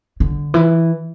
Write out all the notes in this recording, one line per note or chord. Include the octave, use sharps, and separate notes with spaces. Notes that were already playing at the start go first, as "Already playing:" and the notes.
D3
E3